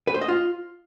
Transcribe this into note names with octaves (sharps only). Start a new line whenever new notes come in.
B4
C5
D#5
F4